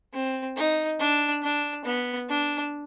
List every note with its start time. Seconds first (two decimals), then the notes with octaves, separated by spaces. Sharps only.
0.13 C4
0.57 D#4
1.00 D4
1.43 D4
1.85 B3
2.29 D4